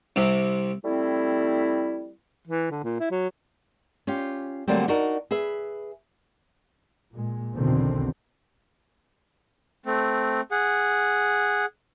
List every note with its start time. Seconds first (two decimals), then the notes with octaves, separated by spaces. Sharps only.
0.16 C2 C3 G4
0.84 G3 A3 C4 E4
2.48 E3
2.71 D3
2.84 A#2
3.00 E4
3.12 F#3
4.07 C#4 F4 G4
4.68 D3 F#3 G3 A3 A#3 C4
4.88 D4 D#4 F#4 A#4
5.31 G#4 B4 E5
7.12 A#2 G#3
7.56 B1 E2 B2 D3 D#3 C4
9.86 A3 C4
10.51 G#4 F#5